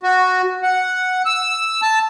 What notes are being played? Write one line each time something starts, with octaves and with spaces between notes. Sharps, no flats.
F#4
F#5
E6
A5